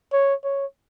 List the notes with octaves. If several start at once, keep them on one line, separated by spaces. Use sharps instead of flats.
C#5
C#5